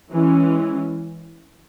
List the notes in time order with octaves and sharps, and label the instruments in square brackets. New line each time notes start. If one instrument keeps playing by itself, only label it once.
[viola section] E3 G#3 C#4